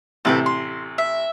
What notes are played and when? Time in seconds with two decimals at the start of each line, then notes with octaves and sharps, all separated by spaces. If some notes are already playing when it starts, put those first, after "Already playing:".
0.25 A1 C3 A4 B4 G5
0.46 C6
0.98 E5